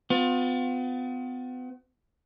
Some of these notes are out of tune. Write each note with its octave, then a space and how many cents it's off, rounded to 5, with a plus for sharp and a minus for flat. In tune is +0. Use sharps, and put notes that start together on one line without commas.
B3 +40 F4 +35